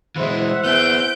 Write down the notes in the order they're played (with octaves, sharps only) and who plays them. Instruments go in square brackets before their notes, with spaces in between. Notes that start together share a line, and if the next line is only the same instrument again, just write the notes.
[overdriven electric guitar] E3 G#3 [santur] E4 C5 [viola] E5 F#5
[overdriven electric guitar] B3 G#4 [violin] G6 D7